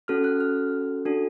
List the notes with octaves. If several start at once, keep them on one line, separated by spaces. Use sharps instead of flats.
C#4 F#4 A4 F6
F#6
F6
D4 F#4 A4